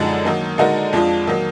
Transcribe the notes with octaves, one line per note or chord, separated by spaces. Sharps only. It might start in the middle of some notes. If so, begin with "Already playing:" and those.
Already playing: F#2 D3 F3 G#3 D#4
D#3 F#3 A#3
D3 G#3 D#4 F#4 A#4
F2 F3 G#3 D4 F4
D#3 F#3 A#3